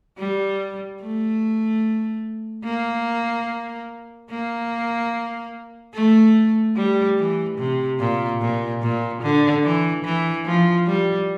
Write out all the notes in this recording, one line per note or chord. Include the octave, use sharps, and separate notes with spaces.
G3
A3
A#3
A#3
A3
G3
E3
C3
A#2
A#2
A#2
D3
E3
E3
F3
G3